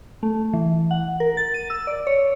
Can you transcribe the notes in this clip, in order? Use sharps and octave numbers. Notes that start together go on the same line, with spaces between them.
A3
E3
F#5
A#4
A6
D#7
E6
D5
C#5